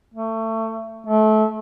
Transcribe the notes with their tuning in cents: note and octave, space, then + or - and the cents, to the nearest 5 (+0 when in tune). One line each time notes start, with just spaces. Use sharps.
A3 +25
A3 -25